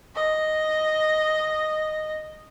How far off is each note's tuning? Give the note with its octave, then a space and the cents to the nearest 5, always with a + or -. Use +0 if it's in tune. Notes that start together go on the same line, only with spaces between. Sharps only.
D#5 -5